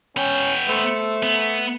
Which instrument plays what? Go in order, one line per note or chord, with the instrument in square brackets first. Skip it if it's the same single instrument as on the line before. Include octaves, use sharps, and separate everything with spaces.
[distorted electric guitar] B3 G5 [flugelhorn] C#4
[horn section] A3 [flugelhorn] C5
[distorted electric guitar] B3